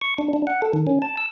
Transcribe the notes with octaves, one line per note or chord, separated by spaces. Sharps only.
C#6
D4
D4
F#5
A4
D#3
C#4
A5
E6